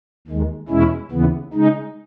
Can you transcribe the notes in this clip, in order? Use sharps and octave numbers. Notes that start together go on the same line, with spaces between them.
D#2 D#3 G#3
E2 B2 G#3 C#4 E4
D#2 C#3 E3 B3
C#3 G#3 D#4